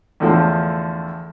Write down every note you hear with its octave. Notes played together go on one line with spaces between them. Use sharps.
E2 A2 D3 F3